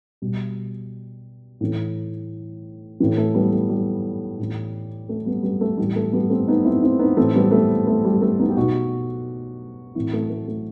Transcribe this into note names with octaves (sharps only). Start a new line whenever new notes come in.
B2 G3
A2 E3
A2 E3
A3
G3 B3
A3
G3
A2 E3
A3
G3 B3
G3 B3
A3
A2 E3 G3
A3
G3 B3
A3 C4
B3 D#4
C4 E4
C4 E4
B3 D#4
A2 E3 A3 C4
G3 B3
A3
A3
G3
A3
B3 D#4
G4
B2 D#4 F#4
A2 E3 C4 E4
A3
A3
A3